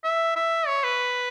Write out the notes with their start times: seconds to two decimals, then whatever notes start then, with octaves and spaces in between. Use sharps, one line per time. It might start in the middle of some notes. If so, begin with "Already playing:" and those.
0.04 E5
0.36 E5
0.67 C#5
0.84 B4